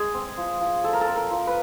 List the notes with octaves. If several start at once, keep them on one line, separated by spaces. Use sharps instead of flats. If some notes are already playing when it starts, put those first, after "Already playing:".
Already playing: G#3 G#4
C4
F3
F3
G#3 A4
A#4
A4
C4
A#4
F3
B4